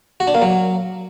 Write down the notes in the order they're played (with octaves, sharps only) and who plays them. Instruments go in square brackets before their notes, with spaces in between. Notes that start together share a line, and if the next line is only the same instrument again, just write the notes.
[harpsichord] F#4
D4
A#3
F#3